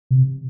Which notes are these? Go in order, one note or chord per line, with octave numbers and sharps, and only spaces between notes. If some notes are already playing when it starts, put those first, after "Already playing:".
C3